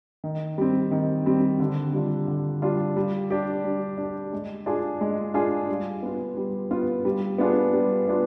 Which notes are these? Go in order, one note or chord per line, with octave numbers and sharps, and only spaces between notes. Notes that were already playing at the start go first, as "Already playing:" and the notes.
D#3
G3 C4
D#3
G3 C4
D3
G3 D4 F4
D3
G3 D4 F4
G3
D4 G4
G3
D4
G4
G#3
D4 F4 G#4
G#3
D4 F4 G#4
G3
B3 F4
G3
B3 F4
G3
B3 D4 F4 G#4
G3
B3 D4 F4